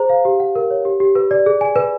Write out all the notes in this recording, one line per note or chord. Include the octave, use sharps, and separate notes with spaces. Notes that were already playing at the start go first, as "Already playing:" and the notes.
Already playing: G#4 C5 A#5
F5
G4
F#5
A#4
C#5
G4
G4
B4
D5
G#4
G#5
B4